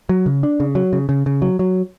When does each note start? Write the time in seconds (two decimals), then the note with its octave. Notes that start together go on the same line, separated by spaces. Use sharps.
0.09 F#3
0.26 C#3
0.43 D4
0.60 C#3
0.75 F#3
0.93 C#3
1.09 C#3
1.26 C#3
1.42 F#3
1.59 F#3